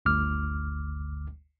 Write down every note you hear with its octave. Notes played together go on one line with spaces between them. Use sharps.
G1 D2 D6 F6